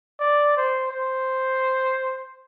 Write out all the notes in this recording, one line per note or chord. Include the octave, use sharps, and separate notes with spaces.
D5
C5
C5